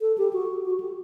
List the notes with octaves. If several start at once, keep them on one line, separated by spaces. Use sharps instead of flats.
A4
G4
F#4
F#4
G4